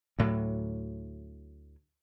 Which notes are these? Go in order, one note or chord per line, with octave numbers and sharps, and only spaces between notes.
D2 A2 F#3